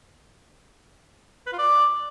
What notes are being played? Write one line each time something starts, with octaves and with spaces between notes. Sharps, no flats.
B4
F4
D5